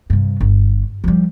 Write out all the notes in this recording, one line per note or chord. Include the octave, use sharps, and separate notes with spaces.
G2 C3
G1
F3 G3